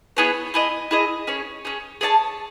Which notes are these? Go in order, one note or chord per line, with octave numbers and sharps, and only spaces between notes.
B3 E4 G#4 C#5
E4 G#4 D#5
E4 G#4 D#5
C#4 G#4 C#5
C#4 G#4 C#5
G#4 C#5 E5 A5